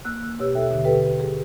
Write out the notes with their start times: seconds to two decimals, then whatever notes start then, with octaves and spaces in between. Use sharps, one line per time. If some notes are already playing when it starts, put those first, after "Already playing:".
0.05 A#3 E6 F#6
0.39 B2 G4 C#5 E6
0.55 D#2 A4 E5 G5
0.70 D#2 B2 D3
0.85 G4 A4 B4 G5
1.20 G#4